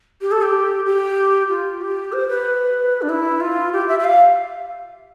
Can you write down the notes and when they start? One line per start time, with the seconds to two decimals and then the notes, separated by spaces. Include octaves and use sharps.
0.21 G4
0.32 A4
0.42 G4
0.86 G4
1.49 F4
1.81 G4
2.13 C5
2.29 B4
3.02 D4
3.09 E4
3.41 F4
3.73 G4
3.88 E5
3.99 E5
4.04 F5